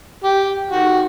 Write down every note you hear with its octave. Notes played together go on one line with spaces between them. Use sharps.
G4
D#3 F#4